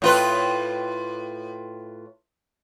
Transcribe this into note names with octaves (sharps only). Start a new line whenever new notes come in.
A2 F4 B4